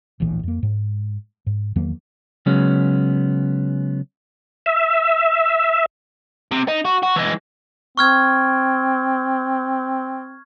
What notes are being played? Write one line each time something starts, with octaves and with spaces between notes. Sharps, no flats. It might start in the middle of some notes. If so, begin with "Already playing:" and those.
D1 A#1 A2 E3
F2 A#3
G#2
G#2
E2 D#3 F#3 A#3
C#3 F#3 G#3 B3 C#4
E5
C3
D#4
F#4
F#4
E3 G#3
C4 C#6 F6 G#6